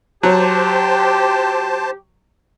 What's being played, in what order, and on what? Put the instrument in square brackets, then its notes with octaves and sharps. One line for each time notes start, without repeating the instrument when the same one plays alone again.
[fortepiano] F#3 [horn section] G4 [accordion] C5 A5